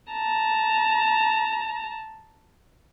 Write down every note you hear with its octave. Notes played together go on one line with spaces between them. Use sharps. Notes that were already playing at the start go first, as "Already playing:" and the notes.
A5 A#5